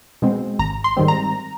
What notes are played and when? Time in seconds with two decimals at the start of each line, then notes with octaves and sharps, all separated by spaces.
0.22 B2 G#3 C4
0.59 G#1 A#5
0.84 C6
0.97 G#2 D#3 G3 C4
1.08 A#5